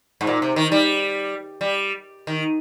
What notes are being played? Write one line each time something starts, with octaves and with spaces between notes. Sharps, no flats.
G#2
A#2
C3
D#3
G3
G3
D#3